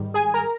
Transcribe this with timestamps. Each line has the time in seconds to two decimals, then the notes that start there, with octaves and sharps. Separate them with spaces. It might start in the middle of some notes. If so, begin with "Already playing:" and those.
Already playing: G#2 D#3 G3
0.14 G#4 G#5
0.34 A#4 A#5